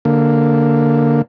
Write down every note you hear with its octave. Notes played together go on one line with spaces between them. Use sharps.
D3 A#3